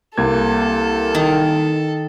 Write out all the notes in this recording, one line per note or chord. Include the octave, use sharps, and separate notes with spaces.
C2 A#3 A4 G#6
D#3